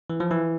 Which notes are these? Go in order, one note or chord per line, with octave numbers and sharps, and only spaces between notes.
E3
F3
E3